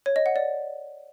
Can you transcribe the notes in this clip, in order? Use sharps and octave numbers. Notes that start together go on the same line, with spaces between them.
C#5
D#5
F#5
D5